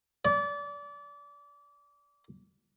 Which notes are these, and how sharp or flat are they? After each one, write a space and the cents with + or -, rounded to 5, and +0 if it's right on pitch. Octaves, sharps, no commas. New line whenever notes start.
D5 -30